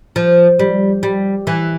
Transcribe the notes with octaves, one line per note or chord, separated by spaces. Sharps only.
F3
G3
G3
E3